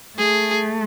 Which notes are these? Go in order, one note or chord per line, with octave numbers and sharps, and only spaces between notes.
A3 G#4